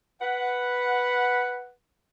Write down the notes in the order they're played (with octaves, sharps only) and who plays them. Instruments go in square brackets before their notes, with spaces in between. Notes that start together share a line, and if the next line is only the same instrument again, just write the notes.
[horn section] B4 F#5